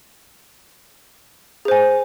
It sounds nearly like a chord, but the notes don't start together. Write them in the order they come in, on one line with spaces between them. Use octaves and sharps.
G#4 C5 G#5